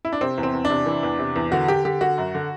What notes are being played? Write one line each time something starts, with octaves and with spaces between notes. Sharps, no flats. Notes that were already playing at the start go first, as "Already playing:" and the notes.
E4
D4
C3 C4
E2
C4
E2
D4
C3
E3
E2
C3
E2
D3 F#4
D3 G4
D3 G4
D3 F#4
F#2
D3